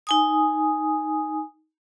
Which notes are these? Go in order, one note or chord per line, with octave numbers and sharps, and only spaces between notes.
D#4 G#5 D#6